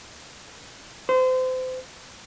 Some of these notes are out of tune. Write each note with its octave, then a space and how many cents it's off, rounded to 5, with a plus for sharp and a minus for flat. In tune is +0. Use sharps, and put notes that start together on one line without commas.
C5 -30